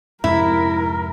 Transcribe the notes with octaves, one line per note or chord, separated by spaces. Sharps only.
F2 G#2 C3 E4 A#4